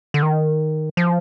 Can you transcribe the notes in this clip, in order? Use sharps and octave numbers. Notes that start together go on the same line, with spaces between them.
D3
D#3
F3